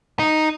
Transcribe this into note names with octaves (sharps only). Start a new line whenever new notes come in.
D#4